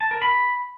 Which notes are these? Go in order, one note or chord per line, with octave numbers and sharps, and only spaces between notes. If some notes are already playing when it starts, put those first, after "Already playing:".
A5
A#4
B5